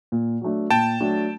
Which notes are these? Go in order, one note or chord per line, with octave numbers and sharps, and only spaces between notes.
A#2
F#3 A3 D4
A#2 G5 A5
F#3 A3 D4